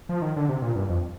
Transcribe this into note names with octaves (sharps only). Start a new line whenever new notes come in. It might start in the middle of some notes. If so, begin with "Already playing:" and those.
F3
D#3
D3
C3
A#2
G2
F2